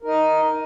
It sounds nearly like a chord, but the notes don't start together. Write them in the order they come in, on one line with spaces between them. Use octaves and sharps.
A#4 D#4 D#5